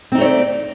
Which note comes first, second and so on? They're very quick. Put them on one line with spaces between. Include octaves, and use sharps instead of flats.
C4 D#4 A3 C#5 D5